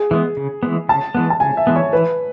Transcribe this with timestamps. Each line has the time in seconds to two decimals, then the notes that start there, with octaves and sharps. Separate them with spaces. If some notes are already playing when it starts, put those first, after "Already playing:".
Already playing: G#4
0.11 E3 G#3 B3
0.37 C#3
0.63 E3 G#3 B3
0.89 C#3 A5
1.15 E3 G#3 B3
1.30 A5
1.40 C#3 G#5
1.57 E5
1.67 E3 G#3 B3
1.76 C#5
1.93 E3 B4